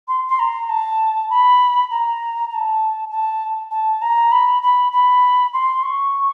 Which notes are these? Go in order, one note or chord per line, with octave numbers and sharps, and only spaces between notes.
C6
C6
A#5
A5
B5
A#5
A#5
A5
A5
A5
A#5
B5
B5
B5
C6
C#6